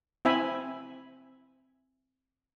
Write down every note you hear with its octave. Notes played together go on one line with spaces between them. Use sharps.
C4 E4 E5 G#5 B5